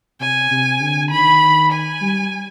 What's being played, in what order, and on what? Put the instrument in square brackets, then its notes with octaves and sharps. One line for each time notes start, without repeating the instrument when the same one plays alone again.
[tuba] C3 [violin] G#5
[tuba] C3
D3
[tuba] D#3 [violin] B5
[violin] G#5
[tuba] G3